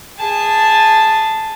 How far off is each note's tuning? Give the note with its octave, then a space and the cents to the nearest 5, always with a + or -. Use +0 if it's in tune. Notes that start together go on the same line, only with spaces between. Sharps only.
G#4 -15 A5 +0